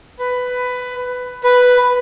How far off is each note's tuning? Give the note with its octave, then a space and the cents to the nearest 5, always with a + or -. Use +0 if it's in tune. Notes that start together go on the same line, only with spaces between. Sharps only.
B4 +15
B4 +5